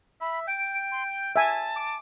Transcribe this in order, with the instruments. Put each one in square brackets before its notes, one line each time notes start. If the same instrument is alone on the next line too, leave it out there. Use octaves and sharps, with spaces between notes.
[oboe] E5 [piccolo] B5
[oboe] G5 [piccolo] D7
[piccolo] C6
G6
[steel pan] E5 G#5 [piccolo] A5
[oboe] D6